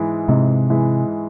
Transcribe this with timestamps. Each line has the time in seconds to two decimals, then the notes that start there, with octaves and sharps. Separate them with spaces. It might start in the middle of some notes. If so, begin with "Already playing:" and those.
Already playing: G#2 E3 G#3 E4
0.28 G#2 C3
0.70 E3 G#3 E4